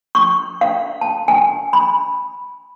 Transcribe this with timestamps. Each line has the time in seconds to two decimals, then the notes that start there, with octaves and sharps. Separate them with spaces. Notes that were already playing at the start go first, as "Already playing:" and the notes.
0.15 C#6
0.61 F5
1.01 A5
1.28 G#5
1.73 B5